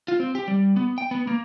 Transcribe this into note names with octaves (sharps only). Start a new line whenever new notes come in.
F4
C4
G4
G3
B3
G5
B3
A#3